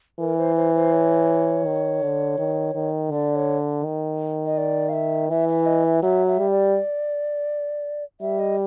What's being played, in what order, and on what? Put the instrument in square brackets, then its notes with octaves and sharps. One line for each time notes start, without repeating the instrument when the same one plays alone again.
[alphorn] E3 [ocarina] A#4
[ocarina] C5
C5
C5
C#5
[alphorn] D#3
D3
D#3
D#3
[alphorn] D3 [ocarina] D5
[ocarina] C#5
[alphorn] D#3
[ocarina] D#5
D5
F5
E5
[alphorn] E3 [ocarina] E5
[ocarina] E5
D#5
E5
[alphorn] F#3 [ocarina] E5
[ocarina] E5
[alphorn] G3
[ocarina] D5
[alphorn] G3 [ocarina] E5
[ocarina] D#5